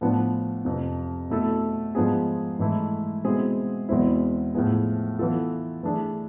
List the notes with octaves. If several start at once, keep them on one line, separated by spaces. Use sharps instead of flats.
A2 F3 B3 D4
F2 C3 F3
B2 A3 E4 A4
G#2 F3 B3 D4 G#4
G#2 E3 A3 E4
B2 G#3 C4 E4 G#4
E2 B2 G#3 C4 E4
A2 F3 B3 E4 G#4
E3 B3 F4 A4
E3 A3 D4 G#4